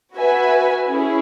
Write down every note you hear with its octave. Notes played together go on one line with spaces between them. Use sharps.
F#4 B4 E5 G#5
C#4 E4 G#4